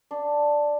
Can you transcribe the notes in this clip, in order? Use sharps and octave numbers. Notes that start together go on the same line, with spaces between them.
D4